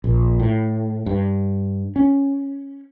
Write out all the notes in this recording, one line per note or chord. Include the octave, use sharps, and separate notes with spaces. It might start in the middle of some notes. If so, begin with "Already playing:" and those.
A#1
A2
G2
C#4